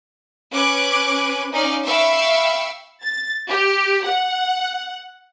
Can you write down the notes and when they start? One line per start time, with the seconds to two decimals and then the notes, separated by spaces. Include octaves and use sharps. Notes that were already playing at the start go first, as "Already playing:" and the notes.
0.54 C#4 B4 D6 F#6 G#6
1.52 C#4 D#4 D5 F5 F6
1.86 E5 F5 G5 B5 C#6 E6
3.03 A6
3.49 G4
4.06 F#5